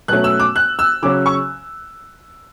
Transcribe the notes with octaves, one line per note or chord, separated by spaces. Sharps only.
B2 F#3 A3 C#4 F#6
E6
D6
F#6
E6
C#3 F#3 C#4 D6
C#6